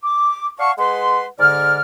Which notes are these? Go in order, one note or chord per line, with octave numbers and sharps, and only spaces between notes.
D6
D5 F5 F#5 A5 C#6
G#3 B4 F#5 C6
G#2 D3 D5 F6